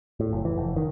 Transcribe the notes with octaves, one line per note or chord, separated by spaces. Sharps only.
A2
F#1
E3
F1
D#3